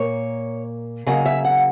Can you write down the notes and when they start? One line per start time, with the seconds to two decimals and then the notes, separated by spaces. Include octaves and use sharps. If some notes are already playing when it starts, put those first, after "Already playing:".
Already playing: A#2 A#3 C#5
1.06 C#3 F#3 A#3 D#5
1.26 E5
1.44 F#5